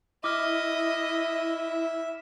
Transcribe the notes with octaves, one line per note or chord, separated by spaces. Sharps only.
E4 D#5 E5 D6 F6